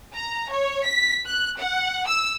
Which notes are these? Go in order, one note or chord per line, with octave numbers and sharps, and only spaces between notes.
A#5
C#5
B6
F#6
F#5
E6